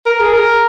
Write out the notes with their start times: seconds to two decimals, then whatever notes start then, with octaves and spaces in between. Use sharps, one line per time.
0.06 A#4
0.20 G#4
0.33 A#4